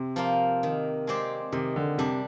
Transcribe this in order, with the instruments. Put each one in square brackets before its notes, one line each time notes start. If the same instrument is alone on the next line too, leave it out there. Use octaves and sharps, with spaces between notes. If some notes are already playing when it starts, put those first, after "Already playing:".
Already playing: [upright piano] C3 [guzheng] C4
[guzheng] F3 A#3 F4
D#3
G#3 C4 G4 D5
[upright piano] C3 [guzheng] D#3
[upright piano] D3
[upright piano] C3 [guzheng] G3 D4